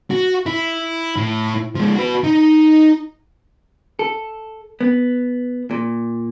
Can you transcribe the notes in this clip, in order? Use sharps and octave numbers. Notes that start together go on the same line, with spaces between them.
F#4
E4
A2
F3 G#3
F#4 B4
D#4
A4
B3
A#2